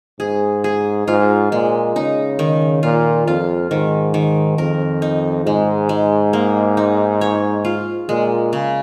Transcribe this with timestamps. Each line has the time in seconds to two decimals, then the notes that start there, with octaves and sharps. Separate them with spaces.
0.20 G#2 G#4
0.64 G#4
1.08 G#2 F4
1.52 A#2 G#3
1.96 C#3 D#4
2.39 D#3
2.83 A#2 F4
3.27 F2 F4
3.71 G#2 D#3
4.14 D#3
4.58 F2 A#4
5.02 D#4
5.46 G#2 G#3
5.89 G#3
6.33 A#3
6.77 D#4
7.21 C#5
7.65 F4
8.09 A#2 G#3
8.53 C#3